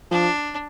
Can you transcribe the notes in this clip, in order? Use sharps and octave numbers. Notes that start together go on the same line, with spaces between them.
F3 D4